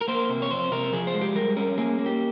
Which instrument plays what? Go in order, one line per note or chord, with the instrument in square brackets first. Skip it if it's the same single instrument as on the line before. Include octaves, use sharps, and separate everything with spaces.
[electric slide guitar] A#4
A#3 C5
C3
C#5
F2 C5
C3 A#4
F3 G#4
C5
G#3
G4
G3 A#4
C#4 A#4
A#3 G#4
A#3
G4